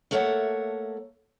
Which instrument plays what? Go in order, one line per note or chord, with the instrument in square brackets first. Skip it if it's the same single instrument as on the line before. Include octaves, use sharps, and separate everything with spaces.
[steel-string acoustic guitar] A3 A#3 A4 C#5 E5 F#5